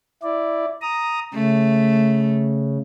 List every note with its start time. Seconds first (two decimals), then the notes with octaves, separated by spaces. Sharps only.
0.23 E4 D5
0.81 A#5 D#6
1.34 C#3 A3